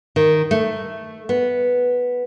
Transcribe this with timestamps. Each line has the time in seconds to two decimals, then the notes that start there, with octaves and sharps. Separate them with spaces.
0.16 D#3
0.51 A3
1.29 B3